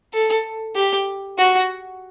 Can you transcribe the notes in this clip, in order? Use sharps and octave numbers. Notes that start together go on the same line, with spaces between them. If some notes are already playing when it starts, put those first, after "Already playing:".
A4
G4
F#4